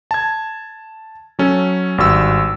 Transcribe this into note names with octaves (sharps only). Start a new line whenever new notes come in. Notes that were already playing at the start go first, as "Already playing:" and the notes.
A5 G#6
F#3 C#4 A4
G#1 G2 F#4 E6